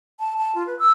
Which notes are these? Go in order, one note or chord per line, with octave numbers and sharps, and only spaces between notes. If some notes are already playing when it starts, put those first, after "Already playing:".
A5
A5
F4
B4
E6